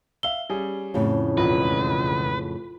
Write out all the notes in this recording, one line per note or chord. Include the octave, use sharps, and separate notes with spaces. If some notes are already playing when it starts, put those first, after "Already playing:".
E5 F5 E6 G7
G3 C#4 G#4
F2 A2 C#3
E1 C#2 F4 B4